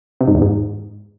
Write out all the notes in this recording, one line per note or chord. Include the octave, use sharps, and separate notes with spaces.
C3
G#2
E2
G#2